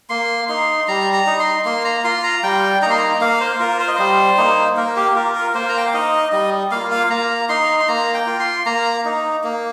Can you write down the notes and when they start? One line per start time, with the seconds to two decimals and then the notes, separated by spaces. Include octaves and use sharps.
0.10 A#3 C6
0.49 D#4 C6
0.88 G3 A#5
1.13 A#5
1.27 D#4
1.40 C6
1.65 A#3 C6
1.85 A#5
2.04 F4 C6
2.24 A#5
2.43 G3 G5
2.82 D#4 A#5
2.86 A#3 C6
2.98 A#5
3.21 A#3 F5
3.40 C5
3.60 F4 A#4
3.80 C5
3.88 D#5
3.96 G3 C5
4.38 A#3 D#4
4.77 A#3 A#4
4.96 G4
5.16 F4 A#4
5.35 A#4
5.55 A#3 C5
5.69 A#5
5.77 G5
5.85 F5
5.94 D#4 D#5
6.32 G3 D#5
6.71 A#3 F4 F5
6.91 F5
7.10 A#3 A#5
7.49 D#4 C6
7.80 C6
7.88 A#3 A#5
8.14 G5
8.27 F4
8.40 C6
8.66 A#3 A#5
9.05 D#4
9.44 A#3